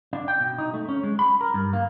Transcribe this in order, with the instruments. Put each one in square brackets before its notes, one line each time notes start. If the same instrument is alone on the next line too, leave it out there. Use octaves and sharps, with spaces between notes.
[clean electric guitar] D4
G5
B2
D#4
A3
C#4
G#3
B5
A#4
G2
A#3